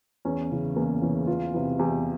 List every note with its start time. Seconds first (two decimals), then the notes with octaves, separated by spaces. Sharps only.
0.25 E2 C#4
0.51 C#3 E3
0.76 E2 A#3
1.02 C#3 E3 C#4
1.27 E2 F4
1.54 C3 E3
1.79 E2 G4